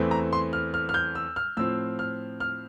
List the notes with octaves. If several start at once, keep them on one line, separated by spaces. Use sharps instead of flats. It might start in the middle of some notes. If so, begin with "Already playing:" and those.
Already playing: E2 E3 A3 C4
A#5
C6
F6
F6
F6
G6
E6
F6
A2 F3 C4 E6
F6
F6